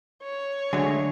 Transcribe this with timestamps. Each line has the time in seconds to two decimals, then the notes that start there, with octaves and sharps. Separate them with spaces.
0.23 C#5
0.73 D3 F#3 G#3 A3 G#5